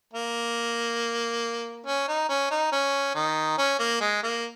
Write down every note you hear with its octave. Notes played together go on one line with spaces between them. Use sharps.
A#3
C#4
D#4
C#4
D#4
C#4
D#3
C#4
A#3
G#3
A#3